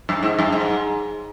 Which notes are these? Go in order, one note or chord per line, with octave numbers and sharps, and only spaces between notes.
F#2
G#2
F#2
G#2